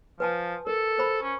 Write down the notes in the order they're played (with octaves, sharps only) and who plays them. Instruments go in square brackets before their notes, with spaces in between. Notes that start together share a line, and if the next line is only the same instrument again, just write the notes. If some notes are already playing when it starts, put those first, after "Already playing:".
[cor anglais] F3 [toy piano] B4 G#5 A5
[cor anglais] A4 [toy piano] A#4
[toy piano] A#4 C5 B5
[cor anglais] C#4